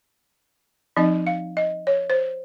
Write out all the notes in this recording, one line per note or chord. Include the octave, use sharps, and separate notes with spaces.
F3 C4 D#4 D#5
F5
D#5
C#5
C5